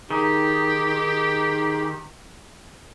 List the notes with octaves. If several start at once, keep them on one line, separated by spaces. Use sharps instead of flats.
D#3 D#4 G4 G#4